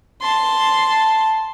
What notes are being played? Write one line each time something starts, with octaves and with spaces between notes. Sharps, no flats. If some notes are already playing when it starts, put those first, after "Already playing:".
A5 C6